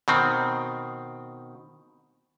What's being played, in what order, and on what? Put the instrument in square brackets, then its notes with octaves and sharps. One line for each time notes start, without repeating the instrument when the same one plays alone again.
[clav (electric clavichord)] B2 D#3 C4